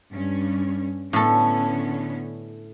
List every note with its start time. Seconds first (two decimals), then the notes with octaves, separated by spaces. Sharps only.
0.12 G2 C#4
1.13 A2 D3 B3 C#4 A4